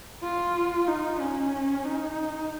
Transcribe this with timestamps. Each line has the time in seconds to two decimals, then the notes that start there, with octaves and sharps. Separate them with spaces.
0.23 F4
0.87 D#4
1.21 C#4
1.86 D#4